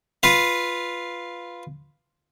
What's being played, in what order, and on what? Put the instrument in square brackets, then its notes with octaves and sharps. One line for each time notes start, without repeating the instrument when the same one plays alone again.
[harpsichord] F4 B4 F5